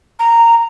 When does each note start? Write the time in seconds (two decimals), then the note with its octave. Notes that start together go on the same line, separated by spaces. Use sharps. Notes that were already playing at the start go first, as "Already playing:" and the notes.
0.19 A#5